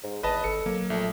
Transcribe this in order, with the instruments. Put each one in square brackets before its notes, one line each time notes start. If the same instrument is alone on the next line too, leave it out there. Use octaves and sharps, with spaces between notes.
[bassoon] G#2
[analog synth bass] G#1 [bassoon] E2 [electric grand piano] B4 D#5 A5
[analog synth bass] G#1 [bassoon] A4 [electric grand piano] C#7
[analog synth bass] F#3 [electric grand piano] A#3
[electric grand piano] A#1 [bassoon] A3